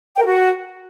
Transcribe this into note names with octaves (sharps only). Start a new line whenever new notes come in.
G5
A#4
F#4